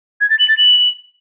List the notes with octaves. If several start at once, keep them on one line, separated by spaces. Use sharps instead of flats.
G#6
A6
F#7
A6
F#7